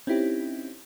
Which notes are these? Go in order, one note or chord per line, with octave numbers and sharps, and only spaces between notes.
C4 C#4 D#4 E4 G4